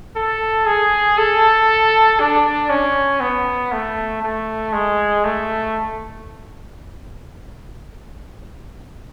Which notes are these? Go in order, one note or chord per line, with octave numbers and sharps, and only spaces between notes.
A4
G#4
A4
D4
C#4
B3
A3
A3
G#3
A3